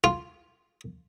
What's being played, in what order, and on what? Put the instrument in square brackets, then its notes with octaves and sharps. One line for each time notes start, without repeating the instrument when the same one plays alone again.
[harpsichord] F4